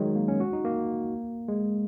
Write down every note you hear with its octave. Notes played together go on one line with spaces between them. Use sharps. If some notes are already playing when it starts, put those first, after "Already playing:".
Already playing: D#3 F#3 G#3
A#3
C#4
F#4
D#4
A#3
G#3